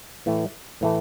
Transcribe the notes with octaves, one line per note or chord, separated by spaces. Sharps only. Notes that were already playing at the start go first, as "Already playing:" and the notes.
A2 E3 A3
A2 E3 A3